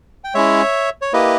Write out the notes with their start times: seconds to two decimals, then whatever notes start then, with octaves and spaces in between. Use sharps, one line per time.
0.24 G5
0.34 G#3 C#4 E4 C#5 E5
1.02 C#5
1.13 A#3 E4 G4 B4 D#5